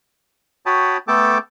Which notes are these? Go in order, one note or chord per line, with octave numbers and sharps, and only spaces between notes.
F#4 C#5 G5 A5 B5 D#6
A3 B3 A4 G5 A5 D6